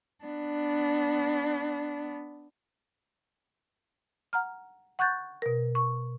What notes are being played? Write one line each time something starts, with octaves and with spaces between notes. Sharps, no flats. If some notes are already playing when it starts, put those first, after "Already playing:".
B3 D4
F#5 A#5 F6
F#5 C#6 F#6 G6 A6
B2 A#4
C#6